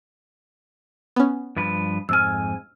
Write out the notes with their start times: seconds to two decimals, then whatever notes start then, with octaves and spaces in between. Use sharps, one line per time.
1.16 B3 C#4
1.56 G2 F3 B4
2.09 F2 G#2 G#5 E6 F6